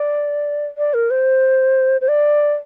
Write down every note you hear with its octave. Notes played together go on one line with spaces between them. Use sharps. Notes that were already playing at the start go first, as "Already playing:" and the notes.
Already playing: D5
D5
A#4
C5
C5
D5